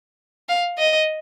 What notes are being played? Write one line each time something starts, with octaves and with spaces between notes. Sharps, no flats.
F5
D#5